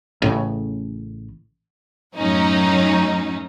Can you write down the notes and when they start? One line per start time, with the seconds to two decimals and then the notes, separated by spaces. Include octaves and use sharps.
0.22 A1 A2 C#3
2.17 F#2 A2 F#3 C#4 D#4